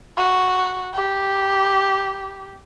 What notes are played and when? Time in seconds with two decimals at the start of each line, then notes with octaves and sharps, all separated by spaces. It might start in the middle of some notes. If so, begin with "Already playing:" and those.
0.17 F#4
0.94 G4